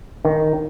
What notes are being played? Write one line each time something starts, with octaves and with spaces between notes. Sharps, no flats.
D#3